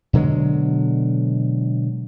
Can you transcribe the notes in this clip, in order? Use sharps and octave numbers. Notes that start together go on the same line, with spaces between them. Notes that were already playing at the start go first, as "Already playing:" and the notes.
B2 D3 F#3 G#3